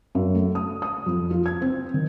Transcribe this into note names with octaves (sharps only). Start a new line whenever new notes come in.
F#2
A3
D#6
D#6
F2
F4
G#6
C4
D#3